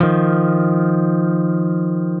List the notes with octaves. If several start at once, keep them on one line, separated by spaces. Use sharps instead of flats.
D#3 F3